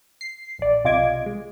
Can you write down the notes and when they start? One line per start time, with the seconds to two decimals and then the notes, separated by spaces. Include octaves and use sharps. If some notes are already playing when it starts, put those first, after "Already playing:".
0.21 C7
0.58 A#1 D5
0.84 B1 C3 F4 D#5 D6 G#6
1.26 G#3